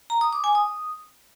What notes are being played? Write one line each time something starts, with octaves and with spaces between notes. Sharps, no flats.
A#5
D#6
D6
G#5
D#6